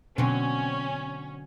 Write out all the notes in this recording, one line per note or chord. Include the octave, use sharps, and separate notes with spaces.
B2 D3 F#3 C4 C#4